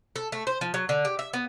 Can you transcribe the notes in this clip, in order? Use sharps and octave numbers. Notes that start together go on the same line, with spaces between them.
A4
A3
C5
F3
F#3
D3
G4
E5
B3